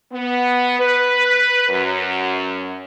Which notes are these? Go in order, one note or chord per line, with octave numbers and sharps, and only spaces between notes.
B3
B4
F#2